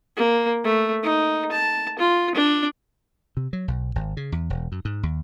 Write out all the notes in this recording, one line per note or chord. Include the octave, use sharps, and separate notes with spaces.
A#3
A3
D#4
A5
F4
D4
C3
F#3
B1
G#1
C#3
E2
E1
F#2
G#2
D#2